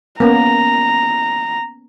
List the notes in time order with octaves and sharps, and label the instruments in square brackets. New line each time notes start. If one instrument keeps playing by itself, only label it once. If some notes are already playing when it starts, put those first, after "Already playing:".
[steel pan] A#3 B3 C#4 [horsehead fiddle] A#5